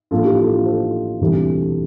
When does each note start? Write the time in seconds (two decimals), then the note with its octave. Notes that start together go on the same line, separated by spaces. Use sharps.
0.11 A1 A2 F3 A#3 D4 F4 A4
0.25 E4 G4
0.38 F4 A4
0.52 F4 A4
0.66 A4 C5
1.20 E1 D2 C3 E3 G3